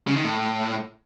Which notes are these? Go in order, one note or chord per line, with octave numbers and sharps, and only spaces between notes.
C#3
D#3
A2